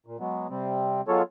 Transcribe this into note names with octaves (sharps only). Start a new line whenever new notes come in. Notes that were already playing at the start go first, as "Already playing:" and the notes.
A#2
F#3 G#3 B3
C3 G3 C4
F#3 G#3 B3 F4 A4 C#5